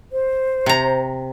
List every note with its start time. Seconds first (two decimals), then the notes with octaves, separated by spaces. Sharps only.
0.12 C5
0.66 C3 A#5